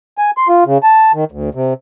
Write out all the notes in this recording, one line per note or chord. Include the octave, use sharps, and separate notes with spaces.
G#5
C6
F4
C#3
A5
D#3
D2
C3